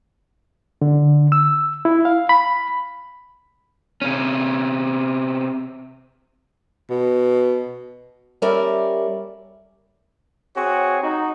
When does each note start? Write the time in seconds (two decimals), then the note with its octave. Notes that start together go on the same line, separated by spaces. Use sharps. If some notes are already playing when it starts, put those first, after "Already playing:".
0.82 D3
1.32 E6
1.85 E4
2.05 F5
2.29 B5
4.02 C3 C#4
6.90 B2
8.42 G3 C#4 A#4 D5 E5
10.56 C4 F#4 G#4 C#5
11.01 D#4 F#4